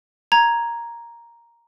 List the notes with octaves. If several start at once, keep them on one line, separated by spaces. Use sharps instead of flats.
A#5 G#6